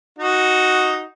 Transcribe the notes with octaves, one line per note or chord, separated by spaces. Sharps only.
D#4 F#4